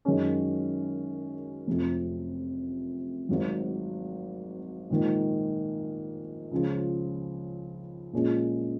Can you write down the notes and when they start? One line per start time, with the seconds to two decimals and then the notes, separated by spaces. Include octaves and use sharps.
0.05 F#2 D#3 G#3 C#4
1.67 F1 F2 C3
3.29 G#1 G#2 F#3
4.90 A#1 G#2 D#3
6.51 C#2 C#3 F3
8.13 A#1 A#2 G#3 C#4